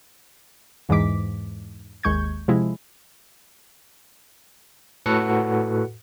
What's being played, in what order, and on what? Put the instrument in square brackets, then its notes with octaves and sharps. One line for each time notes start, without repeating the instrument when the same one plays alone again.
[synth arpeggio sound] E2 G#2 E3 G#3 D6 B6
G#1 D#2 G#3 C#6 G6 G#6
C3 F3 G#3 E4
[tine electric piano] A2 F#4 A4 B4 F#5 C#7